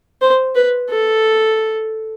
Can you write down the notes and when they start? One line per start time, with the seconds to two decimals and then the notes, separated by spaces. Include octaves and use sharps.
0.22 C5
0.55 B4
0.90 A4